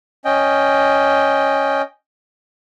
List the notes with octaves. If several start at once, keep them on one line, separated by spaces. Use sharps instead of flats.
C#4 D#5 G5